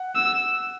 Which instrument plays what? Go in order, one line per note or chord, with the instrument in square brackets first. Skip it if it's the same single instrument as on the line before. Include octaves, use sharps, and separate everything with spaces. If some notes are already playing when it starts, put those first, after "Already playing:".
Already playing: [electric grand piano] F#5
[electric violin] E6